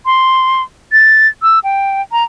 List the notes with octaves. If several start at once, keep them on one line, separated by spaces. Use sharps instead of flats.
C6
A6
E6
G5
A#5